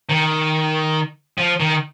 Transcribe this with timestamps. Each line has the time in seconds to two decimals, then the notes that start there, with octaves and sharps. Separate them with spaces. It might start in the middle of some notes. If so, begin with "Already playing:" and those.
0.09 D#3
1.38 F3
1.60 D#3